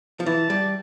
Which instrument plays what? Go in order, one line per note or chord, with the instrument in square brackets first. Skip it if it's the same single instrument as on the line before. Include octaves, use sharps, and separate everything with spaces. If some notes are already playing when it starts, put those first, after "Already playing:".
[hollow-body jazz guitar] F3
[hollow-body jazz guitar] E3 [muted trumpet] A5
[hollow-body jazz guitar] G3